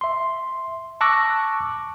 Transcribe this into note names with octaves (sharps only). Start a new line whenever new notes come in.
E5 C6
A5 C#6 D6 E6 F#6 A#6